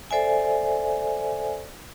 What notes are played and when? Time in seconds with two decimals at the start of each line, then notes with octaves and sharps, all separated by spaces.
0.11 A4 C5 D5 E5 G#5